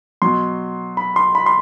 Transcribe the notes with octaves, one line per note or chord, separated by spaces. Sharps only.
B2 F#3 C6
B5
C6
B5
C6